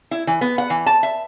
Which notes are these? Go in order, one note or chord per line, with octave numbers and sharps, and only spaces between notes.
E4
E3
B3
F#5
E3
A5
E5